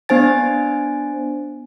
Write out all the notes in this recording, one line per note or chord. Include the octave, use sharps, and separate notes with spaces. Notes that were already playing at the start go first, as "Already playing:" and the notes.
B3 D4 C5 G#5 A6